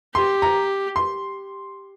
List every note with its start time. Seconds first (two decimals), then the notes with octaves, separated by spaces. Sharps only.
0.15 G4 C6
0.42 A#5
0.96 C6